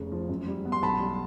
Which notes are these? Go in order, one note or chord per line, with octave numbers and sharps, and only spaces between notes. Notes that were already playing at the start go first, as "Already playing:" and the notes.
Already playing: F1 C#3
F3
F#2
G3
B3
C6
B1 A5 B5
G3